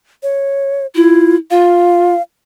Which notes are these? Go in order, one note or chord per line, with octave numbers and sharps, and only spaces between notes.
C#5
E4 F4
F4 F5